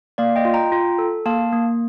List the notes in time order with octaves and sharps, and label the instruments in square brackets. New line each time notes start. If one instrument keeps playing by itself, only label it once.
[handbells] A#3 D5 F5
D#5 G5
F4
G5 A#5
F4
A4
A#3 F5 A5
A#3